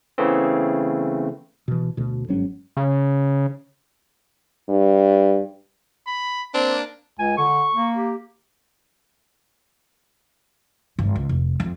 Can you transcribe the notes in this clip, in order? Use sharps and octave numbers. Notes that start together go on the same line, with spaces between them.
C#3 E3 A3 B3 C4
B2 E3
D2 B2
G1 G#2 F#3 C#4
C#3
G2
B5
A#3 C4 D4
C#2 G#5
D3 C#6
A#3
G4
G#1 G2
C#2
F1
F2